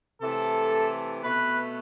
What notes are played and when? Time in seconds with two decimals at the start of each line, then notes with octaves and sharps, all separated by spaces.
0.22 C3 E3 A3 A4
1.24 B2 A3 B4